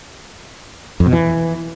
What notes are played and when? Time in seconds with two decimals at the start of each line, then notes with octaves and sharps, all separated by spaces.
1.00 F2
1.06 B2
1.13 E3